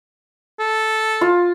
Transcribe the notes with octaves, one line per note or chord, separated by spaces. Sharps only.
A4
F4